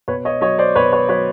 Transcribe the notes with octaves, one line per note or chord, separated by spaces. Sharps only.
B2 B4 C#5
C#5 D#5
F#3 C#5 D#5
C5 D5
B2 B4 C#5
B4 C#5
F#3 B4 C#5